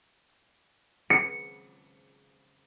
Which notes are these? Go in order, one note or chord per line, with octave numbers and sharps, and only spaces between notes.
C#7